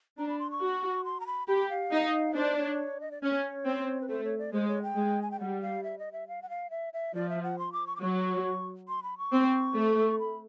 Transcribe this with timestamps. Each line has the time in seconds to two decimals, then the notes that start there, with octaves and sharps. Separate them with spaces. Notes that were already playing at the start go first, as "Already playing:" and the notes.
0.18 D4 A#5
0.29 B5
0.39 C6
0.51 C#6
0.61 F#4
1.05 C6
1.20 A#5
1.27 B5
1.48 G4 B5
1.69 F5
1.92 D#4
2.35 D4 C5
2.58 C#5
3.01 D#5
3.11 D5
3.23 C#4 C#5
3.66 C4
4.01 B4
4.09 A3 C5
4.24 C#5
4.38 D5
4.53 G#3 C5
4.68 C#5
4.83 G5
4.96 G#3
5.22 G#5
5.31 G5
5.40 G3 F#5
5.62 F5
5.83 E5
5.99 D#5
6.12 E5
6.28 F5
6.42 F#5
6.50 F5
6.70 E5
6.93 E5
7.14 F3 D5
7.29 E5
7.43 F#5
7.59 C6
7.73 D6
7.87 C#6
7.96 D6
8.02 F#3 C#6
8.88 C6
9.03 B5
9.18 C#6
9.33 C4
9.75 A3
10.19 B5